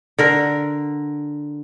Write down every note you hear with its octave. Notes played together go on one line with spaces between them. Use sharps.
D3 A#4